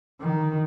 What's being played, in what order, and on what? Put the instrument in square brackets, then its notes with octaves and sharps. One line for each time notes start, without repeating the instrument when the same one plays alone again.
[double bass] D#3